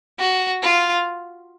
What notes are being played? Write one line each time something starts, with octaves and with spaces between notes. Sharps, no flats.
F#4
F4